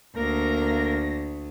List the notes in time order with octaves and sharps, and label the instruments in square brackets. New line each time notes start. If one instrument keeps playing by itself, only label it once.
[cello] D2 [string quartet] A#3 A#6 [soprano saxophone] A#4